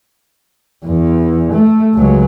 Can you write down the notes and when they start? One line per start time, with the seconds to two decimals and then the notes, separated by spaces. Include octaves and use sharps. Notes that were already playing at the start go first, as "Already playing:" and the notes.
0.85 E2
1.52 A3
1.94 C#2 F#3